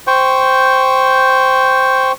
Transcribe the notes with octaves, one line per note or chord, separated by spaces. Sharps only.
C5 G5 C#6